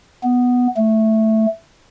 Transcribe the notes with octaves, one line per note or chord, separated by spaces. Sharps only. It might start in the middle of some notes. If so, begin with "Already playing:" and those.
B3
A3